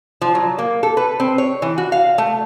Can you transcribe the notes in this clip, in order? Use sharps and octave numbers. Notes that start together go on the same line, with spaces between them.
F3
F#3
A#3
A4
B4
C4
C#5
E3
F#4
F5
A3